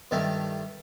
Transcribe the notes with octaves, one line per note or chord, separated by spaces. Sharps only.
G2 D#3 G3 A3